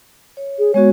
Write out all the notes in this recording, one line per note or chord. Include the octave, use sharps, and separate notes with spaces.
C#5
G#4
G#3 B3 F#4 C#5